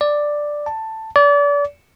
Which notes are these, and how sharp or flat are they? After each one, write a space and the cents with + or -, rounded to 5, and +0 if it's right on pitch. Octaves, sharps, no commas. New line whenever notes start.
D5 +5
A5 +10
D5 -35